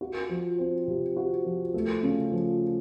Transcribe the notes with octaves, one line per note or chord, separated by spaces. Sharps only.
F#4
F3
C4
C3
F#4
F3
A3
C#3
F3